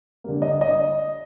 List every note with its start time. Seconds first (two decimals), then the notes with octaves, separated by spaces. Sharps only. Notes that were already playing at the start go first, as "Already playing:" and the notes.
0.24 D3 G3 A#3
0.42 D#5
0.61 D#5